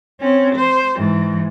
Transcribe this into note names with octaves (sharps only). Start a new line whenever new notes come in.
C4 C#4
C5
G#2 E3